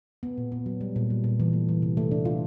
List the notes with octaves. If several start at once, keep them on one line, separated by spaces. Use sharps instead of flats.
B3
A#2
B3
F#3
G3
A#2
G3
A#2
E3
A3
E3
C3
A3
D4
F4